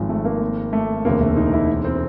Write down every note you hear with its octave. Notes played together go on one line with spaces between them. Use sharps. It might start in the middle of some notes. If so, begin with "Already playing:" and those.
Already playing: G#1 G#2 F3 G#3
A3
A#3
A3
E1 D2 C3 A#3
A3
D#4
E4
C4